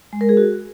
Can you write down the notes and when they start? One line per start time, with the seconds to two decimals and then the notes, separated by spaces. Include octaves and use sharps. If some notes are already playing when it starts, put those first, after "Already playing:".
0.13 G#3
0.21 A#4
0.29 G#4
0.37 F#4